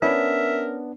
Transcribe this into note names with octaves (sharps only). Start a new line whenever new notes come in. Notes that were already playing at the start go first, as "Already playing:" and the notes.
B3 C#4 D4 A#4 E5